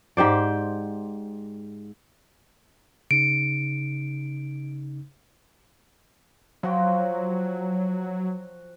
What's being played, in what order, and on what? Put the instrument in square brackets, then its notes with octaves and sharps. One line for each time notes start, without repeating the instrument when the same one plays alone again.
[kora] G#2 G4 C5 D5
[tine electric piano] C#3 D#4 C#7 [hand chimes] D7
[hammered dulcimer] F3 F#4 G5 [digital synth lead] F#3